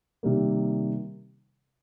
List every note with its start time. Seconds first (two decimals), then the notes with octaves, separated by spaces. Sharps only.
0.23 C3 D#3 G3 A#3